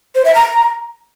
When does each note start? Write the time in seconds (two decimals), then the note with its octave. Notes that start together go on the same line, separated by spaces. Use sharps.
0.15 C5
0.25 E5
0.35 A#5